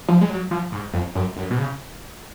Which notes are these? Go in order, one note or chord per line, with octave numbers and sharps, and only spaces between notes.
F3
G#3
F#3
F3
G#2
F2
F#2
F#2
B2
C#3